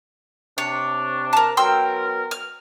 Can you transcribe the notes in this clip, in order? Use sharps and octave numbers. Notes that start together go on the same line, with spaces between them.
C3 D4 C#5
A#4 A5
F#3 B3 A#4 G5 C6 E6
F6